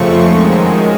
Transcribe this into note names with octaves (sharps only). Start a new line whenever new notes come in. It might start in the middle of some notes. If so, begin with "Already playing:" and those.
Already playing: F2 C#3 F3 A3 C4 C#6
F#2 D#3 G#3